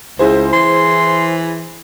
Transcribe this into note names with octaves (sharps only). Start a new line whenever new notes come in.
C#2 E4 G#4 C5
E3 C6